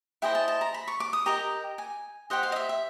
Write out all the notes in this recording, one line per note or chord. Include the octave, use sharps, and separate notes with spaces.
E4 G#4 C5 D#5 G5
A5
A5
A#5
B5
C#6
D6
D#6
G4 A#4 D#5 A#5
G#5
G4 C5 D#5 F#5
F5
D#5
E5
E5